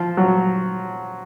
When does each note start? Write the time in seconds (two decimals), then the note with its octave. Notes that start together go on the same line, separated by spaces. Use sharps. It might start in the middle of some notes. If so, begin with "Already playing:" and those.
Already playing: F3
0.17 F#3